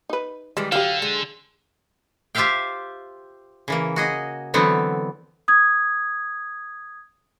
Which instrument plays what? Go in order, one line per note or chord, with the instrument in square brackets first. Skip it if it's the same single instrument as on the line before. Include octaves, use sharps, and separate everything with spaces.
[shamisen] D#4 B4
[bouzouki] D#3 E3 G3 [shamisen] G#3
[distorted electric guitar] D3 [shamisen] F#3 G4 [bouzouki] F5
[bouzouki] G#3
[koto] F4 G4 C5 E5 F5 G5
C#3 E3 A#3
F#4 G#4 D#5
D3 E3 F#3 B3 C4
[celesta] D#6 G#6